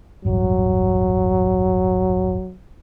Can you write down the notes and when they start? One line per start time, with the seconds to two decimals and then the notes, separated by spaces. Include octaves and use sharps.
0.25 E1 A1 G2 F#3